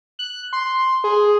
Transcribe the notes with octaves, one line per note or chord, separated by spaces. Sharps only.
F#6
C6
G#4